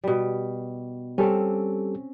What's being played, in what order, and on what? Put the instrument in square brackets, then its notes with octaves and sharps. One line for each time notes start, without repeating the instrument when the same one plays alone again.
[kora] B2 G3
[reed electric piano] G3 G4 A4 [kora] C4 C#4